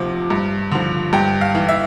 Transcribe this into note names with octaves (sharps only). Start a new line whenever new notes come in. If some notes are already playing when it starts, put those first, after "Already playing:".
Already playing: D2 C3 F3
G2
D3 F3
G2 G5
F5
E3
E5